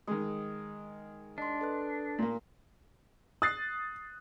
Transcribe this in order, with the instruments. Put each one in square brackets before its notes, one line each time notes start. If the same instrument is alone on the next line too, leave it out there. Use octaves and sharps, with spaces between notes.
[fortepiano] D#3 G#3 [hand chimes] D#6
[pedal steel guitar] D4 [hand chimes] D#5 C6
[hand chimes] A4 B4 F#6
[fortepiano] A#2 A#3
[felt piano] D#6 [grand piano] F#6 A6 C7